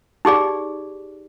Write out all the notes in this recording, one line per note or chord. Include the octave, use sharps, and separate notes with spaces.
D#4 G4 G#4 D5